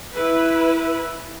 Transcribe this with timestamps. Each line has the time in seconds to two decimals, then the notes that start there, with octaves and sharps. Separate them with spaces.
0.13 E4 B4